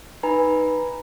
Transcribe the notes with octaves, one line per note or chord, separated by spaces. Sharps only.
D#4 B4 G#5 A#5 B5